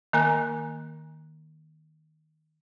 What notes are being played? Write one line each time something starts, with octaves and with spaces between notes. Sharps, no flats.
D#3 A#3 A#4 G#5 F#6